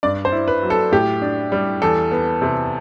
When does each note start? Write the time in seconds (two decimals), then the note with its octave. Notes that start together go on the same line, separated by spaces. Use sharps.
0.03 G2 D5
0.25 C5
0.32 E4
0.48 B4
0.63 F#3
0.70 A4
0.92 A2 G4
1.22 D4
1.52 G3
1.82 E2 A4
2.11 B3
2.42 C3